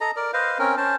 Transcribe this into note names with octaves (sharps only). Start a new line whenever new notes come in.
A4 D#5 A#5
A#4 D5
B4 C5 D#5 F5
C4 C#4 A#4
C#4 C5 A5